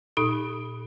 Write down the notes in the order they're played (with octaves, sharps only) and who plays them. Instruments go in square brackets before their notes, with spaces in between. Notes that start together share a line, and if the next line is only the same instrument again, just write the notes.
[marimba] A#2 D#4 A4 D#6